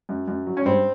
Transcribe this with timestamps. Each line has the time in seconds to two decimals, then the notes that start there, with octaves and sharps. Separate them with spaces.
0.09 F#2
0.28 F#2
0.47 F#3
0.57 C#4
0.65 G2 C4